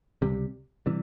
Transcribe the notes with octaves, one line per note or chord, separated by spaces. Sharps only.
C#2 C3 G3
C3 E3 G3